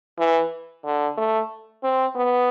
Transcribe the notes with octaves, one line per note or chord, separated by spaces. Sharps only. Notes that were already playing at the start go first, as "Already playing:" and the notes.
E3
D3
A3
C4
B3